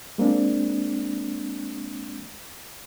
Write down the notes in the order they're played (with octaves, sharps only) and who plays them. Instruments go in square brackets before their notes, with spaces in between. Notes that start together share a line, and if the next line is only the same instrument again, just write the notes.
[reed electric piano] G#3 A#3 C4 D4